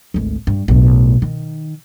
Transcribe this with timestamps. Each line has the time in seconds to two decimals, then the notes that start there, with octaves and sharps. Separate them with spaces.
0.14 G#1 D2
0.47 G2
0.68 B1 A2
1.22 D#3